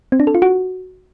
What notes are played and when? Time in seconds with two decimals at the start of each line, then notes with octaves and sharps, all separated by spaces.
0.12 C4
0.20 D4
0.27 A4
0.35 F4
0.42 F#4